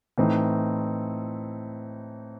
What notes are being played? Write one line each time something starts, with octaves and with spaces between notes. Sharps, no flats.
A2 E3 A3 C4 D#4